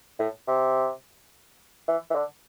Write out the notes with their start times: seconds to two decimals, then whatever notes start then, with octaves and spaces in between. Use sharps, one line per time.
0.19 A2
0.48 C3
1.88 E3
2.10 E3
2.15 D3